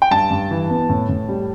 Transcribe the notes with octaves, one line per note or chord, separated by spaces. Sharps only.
G5
G2 A5
G2
E3
B3
A2
A2
G3